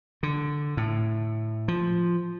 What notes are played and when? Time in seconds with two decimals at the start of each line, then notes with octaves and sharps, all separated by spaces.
0.23 D3
0.77 A2
1.68 F3